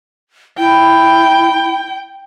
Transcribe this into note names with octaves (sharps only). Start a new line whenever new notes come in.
E4 G5